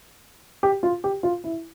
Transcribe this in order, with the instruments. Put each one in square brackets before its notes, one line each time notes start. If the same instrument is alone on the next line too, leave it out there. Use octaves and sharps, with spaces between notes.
[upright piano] G4
F4
G4
F4
E4